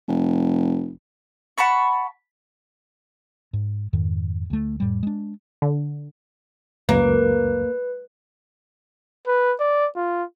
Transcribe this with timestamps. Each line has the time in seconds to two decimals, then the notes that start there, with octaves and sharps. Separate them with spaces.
0.08 F1
1.58 F#5 A5 B5 C#6
3.53 G#2
3.93 F2 G#2 D#3
4.50 D2 A3
4.80 F2 A2 G3
5.03 G#3 D4
5.62 D3
6.89 C#2 F#2 A#3 B4
9.27 B4
9.60 D5
9.96 F4